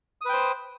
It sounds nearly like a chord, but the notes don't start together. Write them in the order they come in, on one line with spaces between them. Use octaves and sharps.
D#6 B4 G5 C5